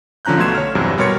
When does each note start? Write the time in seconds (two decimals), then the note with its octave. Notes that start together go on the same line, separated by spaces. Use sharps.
0.25 D3 F3 C#4 A#5 F#6 G6
0.37 B1 B2 A3 C6 G#6 E7
0.55 C#5 F6
0.75 E2 G2 C3 F#3
0.97 B2 G3 A#4 C#5 C6 C#7